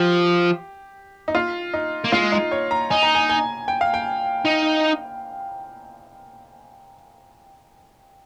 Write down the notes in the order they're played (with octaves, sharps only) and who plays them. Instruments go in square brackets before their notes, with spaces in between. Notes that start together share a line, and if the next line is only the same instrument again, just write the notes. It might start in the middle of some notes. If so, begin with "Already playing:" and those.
Already playing: [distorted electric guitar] F3 [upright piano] G4
[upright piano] D#4
F4
D#4
[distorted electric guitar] A#3
[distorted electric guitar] G#3 [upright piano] F4
[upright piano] D#4
C#5
A#5
[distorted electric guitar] D#4 [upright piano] G#5
[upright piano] A#5
G#5
G#5
G5
F5
G5
[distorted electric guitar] D#4